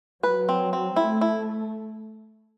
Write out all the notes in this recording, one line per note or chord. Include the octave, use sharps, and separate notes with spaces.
F#3 B4
C4
C4
A3 E4
E4